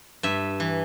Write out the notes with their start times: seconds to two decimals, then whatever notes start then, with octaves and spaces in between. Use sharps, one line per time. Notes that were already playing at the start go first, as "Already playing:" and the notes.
0.23 G2 E5
0.60 E3